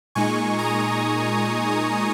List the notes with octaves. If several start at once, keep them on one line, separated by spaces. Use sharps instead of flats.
A#2 G#3 D#4 G#5 C#6
A#5 D#6